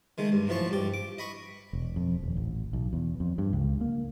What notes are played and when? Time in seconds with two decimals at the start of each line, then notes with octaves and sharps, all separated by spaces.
0.18 D#3 G#3 A3
0.32 G2
0.47 B1 A2 E3 F3 A5 C#6
0.71 G2 G4
0.94 D6
1.18 D#5 B5 C#6
1.73 E1
1.96 F2
2.23 D#1
2.37 A1
2.73 B1
2.93 E2
3.20 F2
3.38 G2
3.53 C#2
3.81 A#3